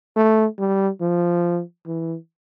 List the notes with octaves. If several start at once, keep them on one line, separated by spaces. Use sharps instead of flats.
A3
G3
F3
E3